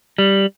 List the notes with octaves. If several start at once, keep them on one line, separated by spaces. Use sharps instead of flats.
G3